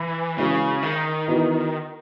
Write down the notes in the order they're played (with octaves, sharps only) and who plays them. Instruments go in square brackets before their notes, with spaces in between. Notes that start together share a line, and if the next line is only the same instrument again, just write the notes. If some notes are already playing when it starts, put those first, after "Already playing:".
Already playing: [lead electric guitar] E3
[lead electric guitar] C#3 [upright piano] E3 G#3 C#4 F#4
[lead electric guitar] D#3
[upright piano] E3 B3 D#4 F#4